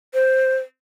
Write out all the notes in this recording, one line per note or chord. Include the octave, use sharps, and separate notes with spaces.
C5